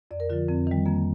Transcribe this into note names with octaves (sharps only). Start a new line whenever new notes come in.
F2 D5
A#4
D3 F3 F4
F2 C4
D#3 G3
F2 A#3